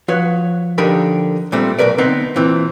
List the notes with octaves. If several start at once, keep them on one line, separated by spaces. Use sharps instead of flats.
F3 F#4 B4 C#5
D3 F3 D#4 G4 A#4 B5
A#2 G3 A3 C4
B1 E2 A#4 B4 D5
D2 B3 C4 D#4
A#2 E3 C4